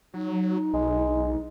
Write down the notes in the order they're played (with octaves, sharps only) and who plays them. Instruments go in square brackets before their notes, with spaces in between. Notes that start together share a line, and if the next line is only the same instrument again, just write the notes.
[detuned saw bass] F#3 [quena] D#4
[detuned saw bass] B1 [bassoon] G#3